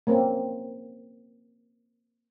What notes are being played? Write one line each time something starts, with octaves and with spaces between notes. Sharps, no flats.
A#3 C4 C#4